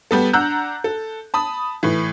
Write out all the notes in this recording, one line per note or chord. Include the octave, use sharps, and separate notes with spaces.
G3 B3 A4
D4 F#5 A#5 E6 F#6 G6
A4
A5 B5 D#6
A2 E3